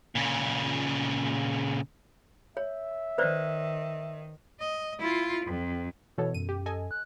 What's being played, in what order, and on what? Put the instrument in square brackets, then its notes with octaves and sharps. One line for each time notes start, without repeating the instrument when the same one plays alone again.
[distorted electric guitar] A#2 C#3
[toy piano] C#5 [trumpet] E5
[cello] D#3 [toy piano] B4 C5 D5
[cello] D#5
E4 F4
F2
[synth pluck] B2 E3 A4 [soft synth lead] C#5
[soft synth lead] F#2 [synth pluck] D#7
[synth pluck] G4
A4 D#5 G#5
[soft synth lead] F#6